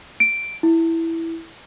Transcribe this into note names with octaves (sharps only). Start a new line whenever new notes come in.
D7
E4